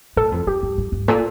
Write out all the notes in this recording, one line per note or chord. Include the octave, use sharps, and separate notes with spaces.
A2 A4
F2
F2 G4
G2
F2
G2
A#2 A4